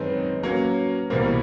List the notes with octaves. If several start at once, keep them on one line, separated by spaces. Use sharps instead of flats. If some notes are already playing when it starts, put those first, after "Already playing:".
Already playing: F#2 D#3 G#3 C4 D#4 B4 C#5
F#3 A#3 C#4
C2 B2 G3 A#3 A#4 C5